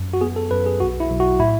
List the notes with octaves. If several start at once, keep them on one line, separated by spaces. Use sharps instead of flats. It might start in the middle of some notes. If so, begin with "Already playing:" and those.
Already playing: F#2
F#4
B3 G#4
A4
F#2 B4
G#4
B1 F#4
E4
B1
F#4
A2 E4